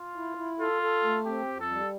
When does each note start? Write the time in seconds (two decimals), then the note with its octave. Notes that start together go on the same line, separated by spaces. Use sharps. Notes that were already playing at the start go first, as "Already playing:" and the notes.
Already playing: F4
0.16 E4
0.37 E4
0.60 F4 A4
0.82 A4
1.04 A3
1.26 C4 G4
1.48 F2
1.60 A4
1.71 G3